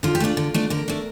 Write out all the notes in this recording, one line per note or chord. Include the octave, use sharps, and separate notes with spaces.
D3 F4
G4
A3 D4 F4
D3
A3 D4
D3 A#4
A3 D4